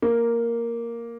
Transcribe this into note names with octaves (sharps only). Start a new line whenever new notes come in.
A#3